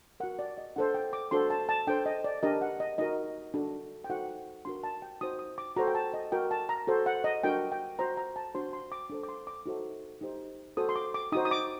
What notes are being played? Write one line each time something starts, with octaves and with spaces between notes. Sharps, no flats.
F#4 A#4 F#5
D5
D#5
D4 A4 C5 F#5
G5
D6
D4 F#4 A4 C5 C6
A5
A5
D4 A4 C5 G5
D#5
D5
D4 G4 A#4 D#5
F#5
D#5
D#4 F#4 A#4 D#5
D4 F#4 A4
G5
D#4 F#4 A4 C5 F#5
D4 F#4 A#4 C6
A5
G5
D#4 F#4 C5 D#6
D#6
D6
F#4 A4 C5 A#5
G5
A5
D#5
F#4 A#4 G5
A5
A#5
F#4 A4 C5
F#5
D#5
D4 F#4 A#4 G5
G5
F#4 C5 A#5
A#5
A5
D4 F#4 C5 C6
C6
D6
D4 A4 C5
D6
C6
D6
D#4 F#4 A4 C5
D#4 G4 C5
F#4 A4 C5 D#6
C6
D6
D6
D#4 F#4 C5 D#6
D#6
D6